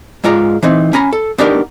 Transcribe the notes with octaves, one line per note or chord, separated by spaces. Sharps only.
G#2 G#3 F4 D5 A#5
E3 C4 D#4
C#4 G#5 A#5 B5
A4
B3 D4 D#4 G4 A#4